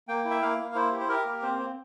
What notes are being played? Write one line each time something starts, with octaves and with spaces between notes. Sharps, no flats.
A#3 G5
E4
E5
A#3 F5
A#3
E4 C5
G4
C5
G4 A#4
A#3
C4 C5
C4